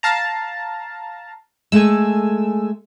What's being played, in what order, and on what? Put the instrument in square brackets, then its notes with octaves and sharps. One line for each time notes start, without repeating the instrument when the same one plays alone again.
[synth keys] F5 A5 A#5
[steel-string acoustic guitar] G#3 A3 [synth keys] G#5 E6